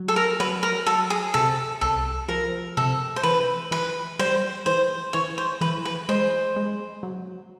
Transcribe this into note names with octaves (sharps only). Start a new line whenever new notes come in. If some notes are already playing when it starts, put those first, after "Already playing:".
Already playing: F#3
A4
A#4
F#3 B4
A#4
F#3 A4
G#4
C3 A4
C2 A4
F3 A#4
C3 A4
C5
E3 B4
E3 B4
G3 C5
E3 C5
E3 C#5
C5
E3 B4
B4
G#3 C5
G#3
F#3